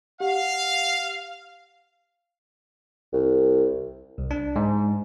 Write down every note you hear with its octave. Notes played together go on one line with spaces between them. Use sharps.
G4 F5 F#5
C2
C2
D4
G#2